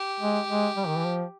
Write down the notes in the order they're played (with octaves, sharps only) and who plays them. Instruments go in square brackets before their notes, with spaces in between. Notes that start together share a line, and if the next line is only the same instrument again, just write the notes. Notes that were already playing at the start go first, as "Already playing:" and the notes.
Already playing: [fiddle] G4
[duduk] G#3
G#3
G3
D#3
E3
F3